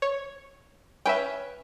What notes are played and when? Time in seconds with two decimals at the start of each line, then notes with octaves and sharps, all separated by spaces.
0.02 C#5
1.06 C#4 B4 E5 G5